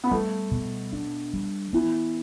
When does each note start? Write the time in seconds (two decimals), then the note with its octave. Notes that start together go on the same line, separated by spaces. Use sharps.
0.04 B3
0.11 G3 A3
0.51 B2
0.93 D4
1.34 G3
1.73 E3 B3